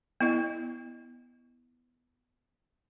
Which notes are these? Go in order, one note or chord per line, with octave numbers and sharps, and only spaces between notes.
B3 E4 D#5